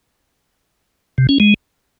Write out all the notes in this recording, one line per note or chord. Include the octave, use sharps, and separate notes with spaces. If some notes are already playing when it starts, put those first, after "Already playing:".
C3
C#4
G#3